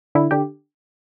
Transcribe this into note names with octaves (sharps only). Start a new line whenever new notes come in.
D3 E4
D3 G4